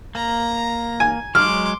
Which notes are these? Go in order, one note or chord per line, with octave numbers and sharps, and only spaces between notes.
A#3 A#5
G#5
F#3 G#3 C6 D6 F6